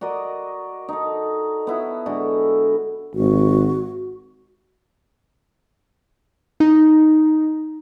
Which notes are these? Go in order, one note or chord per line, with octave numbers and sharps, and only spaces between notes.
F#4 A#4 D5 D#5
D#4 A4
B3 E4 F#4
D3 G#3 F#4 A4
G#1 F#4
D#4